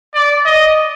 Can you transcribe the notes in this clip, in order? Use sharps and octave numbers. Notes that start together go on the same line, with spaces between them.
D5
D#5